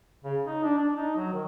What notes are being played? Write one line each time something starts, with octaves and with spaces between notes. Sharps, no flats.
C#3
D#4
D4
D4
D#4
F#3
D#3